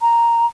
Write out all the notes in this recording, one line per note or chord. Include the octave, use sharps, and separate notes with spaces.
A#5